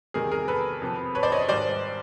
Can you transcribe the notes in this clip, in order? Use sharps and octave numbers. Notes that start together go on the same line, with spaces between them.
E2 C3 D#3 G3 G#4 A#4
G#4 A#4
A4 B4
F2 C3 F3
B4 C#5
C5 D5
C#5 D#5
G#2 D#3 G3 C5 D5